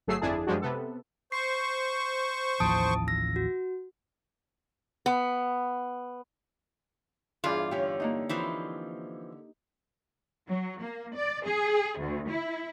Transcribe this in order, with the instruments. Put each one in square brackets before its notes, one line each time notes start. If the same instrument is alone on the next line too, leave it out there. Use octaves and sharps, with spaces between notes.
[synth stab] G1 F#3 A3 G#4 E6 C7
G1 F2 D4 E4 G#4 A5
F#2 F3 G3 G#3 D4 F#4
C3 B3 A4
[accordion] C5 C#6 [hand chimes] C7
[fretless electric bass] A1 D#2 F3 [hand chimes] A5 D#6 D7
[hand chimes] E6 A#6
F#4
[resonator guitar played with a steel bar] B3
[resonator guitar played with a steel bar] E2 G2 F4 [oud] G#4 D5
[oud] D3 C#4 [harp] G4
[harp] A#3 D4 D#4
[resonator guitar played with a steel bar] E3 F3 C4
[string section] F#3
A#3
D5
G#4
D2
E4